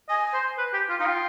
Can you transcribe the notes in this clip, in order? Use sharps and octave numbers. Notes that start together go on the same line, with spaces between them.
D#5 G#5
C5
B4
G4
F4
D#4 F5
F4 G5